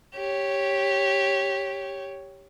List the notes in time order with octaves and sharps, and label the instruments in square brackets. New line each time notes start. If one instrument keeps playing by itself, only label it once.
[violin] G4 C#5